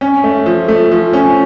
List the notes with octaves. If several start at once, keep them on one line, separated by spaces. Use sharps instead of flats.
C#4
A3
F3
A3
F3
C#4